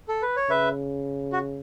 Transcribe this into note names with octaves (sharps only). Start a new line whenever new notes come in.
A4
B4
C#5
C#3 B4 E5
F#4